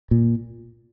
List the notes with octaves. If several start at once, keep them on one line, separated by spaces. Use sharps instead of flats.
A#2